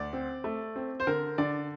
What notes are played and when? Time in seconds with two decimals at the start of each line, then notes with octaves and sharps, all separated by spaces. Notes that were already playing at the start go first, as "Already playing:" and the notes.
Already playing: D2 D5
0.13 C4
0.44 A3
0.76 C4
1.00 C5
1.07 D3 A#4
1.38 D3 D5